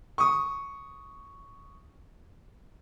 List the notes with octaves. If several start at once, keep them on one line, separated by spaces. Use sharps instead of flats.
C#6 D#6